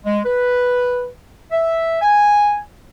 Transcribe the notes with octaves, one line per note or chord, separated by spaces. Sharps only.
G#3
B4
E5
G#5